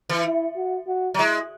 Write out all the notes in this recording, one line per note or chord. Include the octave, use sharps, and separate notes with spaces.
E3
E4
F#4
F#4
F#3
G#3 E4